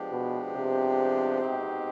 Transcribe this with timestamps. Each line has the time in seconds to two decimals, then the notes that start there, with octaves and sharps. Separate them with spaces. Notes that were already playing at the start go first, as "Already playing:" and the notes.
Already playing: F3 G#3 B3 D4 G4
0.12 B2
0.55 C3
1.41 B2 G#3 C4 D#4 G4